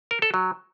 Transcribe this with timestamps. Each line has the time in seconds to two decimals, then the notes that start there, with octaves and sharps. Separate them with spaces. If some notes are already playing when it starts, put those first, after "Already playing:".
0.11 A#4
0.22 A4
0.34 F#3